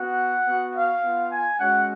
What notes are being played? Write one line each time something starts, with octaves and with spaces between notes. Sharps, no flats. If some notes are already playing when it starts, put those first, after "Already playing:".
Already playing: B3 F#4 F#5
B3 F#4
F5
B3 F4
G#5
G#3 C#4 F#4 F#5